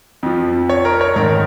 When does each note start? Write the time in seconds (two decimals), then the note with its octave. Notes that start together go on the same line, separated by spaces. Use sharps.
0.23 F2 F3
0.69 C#5
0.85 A#4
1.01 C#5
1.16 G#2 D#3 A#4